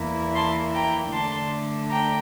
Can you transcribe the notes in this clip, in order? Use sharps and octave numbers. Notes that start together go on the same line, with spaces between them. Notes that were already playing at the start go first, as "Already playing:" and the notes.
Already playing: E2 E3 A#3 E4
A5 C6
G5 A#5
D3 A3 D4 A5 C6
G5 A#5